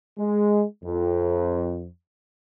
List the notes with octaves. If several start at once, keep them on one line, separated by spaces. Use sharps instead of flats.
G#3
F2